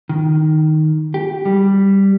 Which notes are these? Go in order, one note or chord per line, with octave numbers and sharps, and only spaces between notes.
D#3
G4
G3